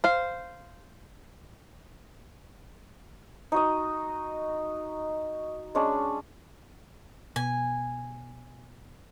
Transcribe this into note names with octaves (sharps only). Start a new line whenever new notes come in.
C5 F5
D#4 F#4 D#5
G#3 C#4 D4
B2 G#5